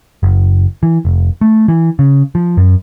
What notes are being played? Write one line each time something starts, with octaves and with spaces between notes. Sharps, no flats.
F#1
E3
F1
A3
E3
C#3
F3
F#2